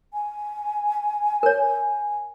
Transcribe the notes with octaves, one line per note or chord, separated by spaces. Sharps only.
G#5
A#4 C#5